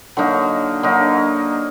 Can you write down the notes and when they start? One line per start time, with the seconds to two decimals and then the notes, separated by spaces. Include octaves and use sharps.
0.17 D3 F#3 A#3 D#4
0.83 D3 F#3 A#3 D#4